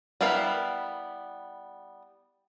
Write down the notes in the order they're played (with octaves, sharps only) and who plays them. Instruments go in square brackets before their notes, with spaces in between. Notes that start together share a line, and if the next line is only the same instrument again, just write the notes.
[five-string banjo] G3 B3 E4 A#4 F5